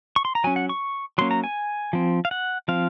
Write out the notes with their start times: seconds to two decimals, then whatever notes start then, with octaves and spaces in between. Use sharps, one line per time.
0.16 C#6
0.25 C6
0.35 A#5
0.44 F#3 C#4 G#5
0.56 F#5
0.69 C#6
1.18 F#3 A#3 C#4 C6
1.31 A#5
1.44 G#5
1.93 F3 C4
2.25 F5
2.31 F#5
2.68 F3 C4 F5